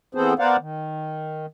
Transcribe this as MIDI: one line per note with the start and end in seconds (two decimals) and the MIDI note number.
0.15 0.33 52
0.15 0.33 59
0.15 0.33 60
0.15 0.33 68
0.15 0.33 69
0.15 0.33 72
0.39 0.57 59
0.39 0.57 70
0.39 0.57 72
0.39 0.57 74
0.39 0.57 77
0.39 0.57 78
0.59 1.46 51